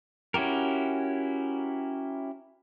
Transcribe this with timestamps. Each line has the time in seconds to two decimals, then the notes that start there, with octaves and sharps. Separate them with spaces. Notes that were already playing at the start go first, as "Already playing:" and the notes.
0.34 C#4 E4 F#4 G4 A#4